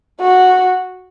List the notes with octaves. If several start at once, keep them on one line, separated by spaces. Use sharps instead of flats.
F#4